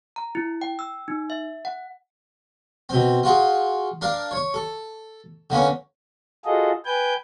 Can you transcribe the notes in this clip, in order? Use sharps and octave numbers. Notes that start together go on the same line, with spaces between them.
A#5
E4
G5
E6
D#4
E5
F#5
B2 C4
F4 F#4 G#4
D4 A#4 F5
C#5 C#6
A4
D3 A#3 B3 C#4
F4 F#4 G#4 A4 D#5
B4 G5 G#5 G6